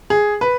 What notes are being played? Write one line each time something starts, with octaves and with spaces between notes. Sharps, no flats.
G#4
B4